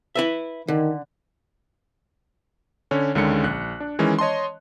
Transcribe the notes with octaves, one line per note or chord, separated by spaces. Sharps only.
E4 B4 E5
D3 D#3
D3 C#4 C#5
C#2 D3 D#3 G#3 C#4 C#7
A#1 F#6
D4
D#3 E3 G#3 C#4
C#5 D#5 A5 C6